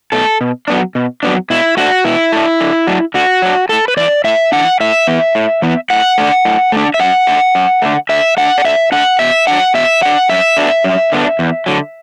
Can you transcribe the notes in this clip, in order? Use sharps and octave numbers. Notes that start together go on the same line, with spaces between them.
B2 A3 A4
B2
F#3 B3 D4
B2
F#3 B3 D4
B2 E4
A3 D4 F#4
B2 E4
A3 D4
D3
F#3 D4
D3 F#4
F#3 D4
A2 A4
B4
E3 D4 D5
A2 E5
E3 D4 F#5
A2 E5
E3 B3
A2
E3 B3
A2 F#5
A3 D4
A2
A3 D4
E5
F#2 F#5
D3 A3
F#2
D3 A3
D3 E5
A3 D4 F#5
D5
D3 E5
A3 D4 F#5
B2 E5
F#3 D4 F#5
B2 E5
F#3 D4 F#5
F#2 E5
D3 B3 D4
F#2
D3 B3 D4
E2
D3 F#3